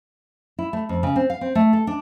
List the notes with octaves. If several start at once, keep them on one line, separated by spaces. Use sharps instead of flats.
E4
A3
F2
C#3
C4
F5
C4
A3
A4
D4